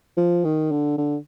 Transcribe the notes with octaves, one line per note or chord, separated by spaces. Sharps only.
F3
D#3
D3
D3